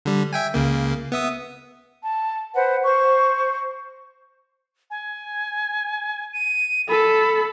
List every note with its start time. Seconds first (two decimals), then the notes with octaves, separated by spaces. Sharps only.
0.05 D3 G3
0.33 E5 G5 G#5
0.54 C#2 C#3 A#3
1.12 B3 E5 D#6
2.04 A5
2.55 B4 C5 F#5
2.84 C5 C#6
4.90 G#5
6.33 D#7
6.89 A4 B5